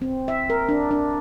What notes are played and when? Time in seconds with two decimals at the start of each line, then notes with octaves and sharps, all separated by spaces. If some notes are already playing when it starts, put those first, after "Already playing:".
0.02 C4
0.28 E5
0.50 A#4
0.69 D4
0.91 D4